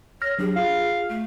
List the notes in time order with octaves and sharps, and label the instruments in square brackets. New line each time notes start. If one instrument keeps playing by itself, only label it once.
[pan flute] C#5 [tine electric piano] F6 A#6
[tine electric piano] F#3 D4 G4 [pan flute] G#4
[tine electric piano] F4 [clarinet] F5
[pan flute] A3